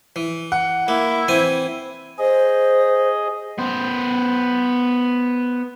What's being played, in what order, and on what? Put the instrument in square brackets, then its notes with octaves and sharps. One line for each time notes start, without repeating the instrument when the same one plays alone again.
[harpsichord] E3
[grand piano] F#5
[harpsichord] A#3 [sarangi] E4
[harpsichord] E3 C4 G#5
[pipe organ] G#4 D#5 [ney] C5
[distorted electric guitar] B3 C5